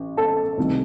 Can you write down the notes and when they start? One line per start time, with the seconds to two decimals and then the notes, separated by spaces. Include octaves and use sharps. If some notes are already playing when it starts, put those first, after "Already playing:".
Already playing: A1
0.17 A4 A5
0.58 C2 C3 D#3 A3